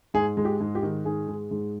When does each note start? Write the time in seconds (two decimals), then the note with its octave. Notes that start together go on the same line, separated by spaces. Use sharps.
0.14 G#2 G#4
0.37 G#3
0.45 G4
0.60 G#2
0.75 G4
0.83 D#3
1.05 G#2 G#4
1.28 G#3
1.51 G#2